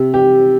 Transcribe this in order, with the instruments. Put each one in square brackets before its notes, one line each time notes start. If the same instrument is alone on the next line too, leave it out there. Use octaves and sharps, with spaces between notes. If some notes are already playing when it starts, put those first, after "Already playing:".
Already playing: [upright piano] C3
G4